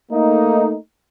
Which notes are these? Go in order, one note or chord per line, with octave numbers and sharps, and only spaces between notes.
A3 A#3 D#4